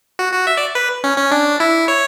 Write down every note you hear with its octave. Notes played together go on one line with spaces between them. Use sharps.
F#4
F#4
E5
D5
B4
C#4
C#4
D4
E4
C#5